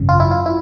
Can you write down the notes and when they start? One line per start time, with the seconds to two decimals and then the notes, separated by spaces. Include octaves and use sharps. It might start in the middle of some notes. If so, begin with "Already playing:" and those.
Already playing: G#1 F#2 C#3 F#3
0.09 F4
0.20 E4
0.31 F4
0.46 E4